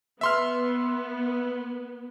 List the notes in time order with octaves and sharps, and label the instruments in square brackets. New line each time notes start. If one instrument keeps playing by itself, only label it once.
[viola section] B3 [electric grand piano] E5 C6 F6